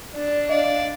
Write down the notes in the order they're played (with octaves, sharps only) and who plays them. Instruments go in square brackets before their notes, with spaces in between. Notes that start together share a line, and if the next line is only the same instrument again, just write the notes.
[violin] D4 [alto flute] D5
[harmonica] D5 [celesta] D#5 [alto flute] F5